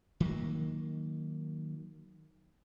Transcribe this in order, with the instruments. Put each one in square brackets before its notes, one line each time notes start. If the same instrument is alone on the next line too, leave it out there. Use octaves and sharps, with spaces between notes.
[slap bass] D#3 F#3 A#3